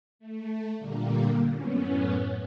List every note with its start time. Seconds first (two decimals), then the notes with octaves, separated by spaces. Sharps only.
0.19 A3
0.78 A#2 D3 G3 A#3
1.52 F#2 A2 B3 C#4